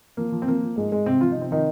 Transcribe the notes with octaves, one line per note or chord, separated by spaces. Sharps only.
F3 A#3
F3
C4
F3 A#3
F3
G#2 G#3
G#2 G#3
G#2 C3 C4
F3 F4
C3 D#4
C4
D#3 F3 D#4